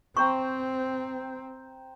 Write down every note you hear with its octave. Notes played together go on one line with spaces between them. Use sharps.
C4 C5 G5 A#5 C#6